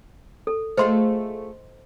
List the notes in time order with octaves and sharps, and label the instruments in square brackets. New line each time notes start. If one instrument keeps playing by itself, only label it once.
[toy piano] A4
[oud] A3 F4 G#4 [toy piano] C5 D#5 C6